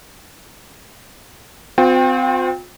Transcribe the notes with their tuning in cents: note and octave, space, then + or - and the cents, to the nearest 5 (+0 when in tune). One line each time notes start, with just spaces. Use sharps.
C4 -25 F4 +45 G5 +20